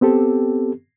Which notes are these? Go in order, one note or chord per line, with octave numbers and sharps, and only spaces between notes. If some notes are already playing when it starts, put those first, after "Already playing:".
B3 C4 G4 A4